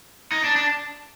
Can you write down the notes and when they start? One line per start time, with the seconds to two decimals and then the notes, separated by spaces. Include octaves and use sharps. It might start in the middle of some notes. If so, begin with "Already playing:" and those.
0.32 D#4
0.44 D4
0.56 D4